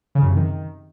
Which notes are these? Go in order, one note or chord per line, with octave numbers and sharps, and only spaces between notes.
C#3
F#2
C3
D#3